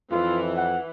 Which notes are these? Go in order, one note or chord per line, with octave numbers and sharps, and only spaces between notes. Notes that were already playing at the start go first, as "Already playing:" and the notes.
F2 E3 F4
F#5